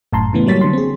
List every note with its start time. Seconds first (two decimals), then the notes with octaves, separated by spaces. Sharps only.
0.13 G1 F#2 A2 A5 A#5 C6
0.33 A2 C#3 E3 A3 B3
0.46 F#3 G3 A#3 C#5 A6 B6
0.61 D3 C6
0.73 C4 G#4